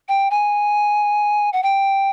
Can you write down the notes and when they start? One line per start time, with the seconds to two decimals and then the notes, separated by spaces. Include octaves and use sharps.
0.09 G5
0.31 G#5
1.53 F#5
1.63 G5